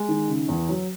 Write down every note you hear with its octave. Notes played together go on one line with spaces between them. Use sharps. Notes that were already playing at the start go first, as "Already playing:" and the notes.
Already playing: G#3
D#3
C#3
E2
F#3